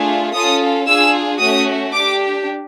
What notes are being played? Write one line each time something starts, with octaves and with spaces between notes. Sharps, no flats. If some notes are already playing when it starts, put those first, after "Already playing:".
Already playing: A3 D4 F4 G#4
C#4 F4 A4 D#6
D4 F4 G#4 E6
A3 C#4 F#4 D#6
D4 G4 D6